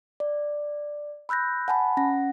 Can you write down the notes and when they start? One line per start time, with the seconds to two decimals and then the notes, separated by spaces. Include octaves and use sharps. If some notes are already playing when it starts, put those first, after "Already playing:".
0.20 D5
1.29 B5 E6 F#6 G6 A#6
1.68 F#5 G#5 A5 B5
1.97 C#4 F#5 A#6